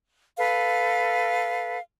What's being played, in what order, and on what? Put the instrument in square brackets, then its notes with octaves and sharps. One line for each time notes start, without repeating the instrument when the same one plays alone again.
[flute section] A4 B4 F5